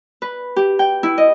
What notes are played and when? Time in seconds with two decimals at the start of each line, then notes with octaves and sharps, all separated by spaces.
0.22 B4
0.56 G4
0.79 G5
1.03 E4
1.18 D#5